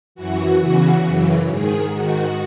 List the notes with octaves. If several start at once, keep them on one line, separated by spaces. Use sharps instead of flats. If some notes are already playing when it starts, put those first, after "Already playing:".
F#2 E3 F#4
E2 C#3 E3
F#2 C#3 E3
G#2 D#3 G#4
G#2 D#3 F#4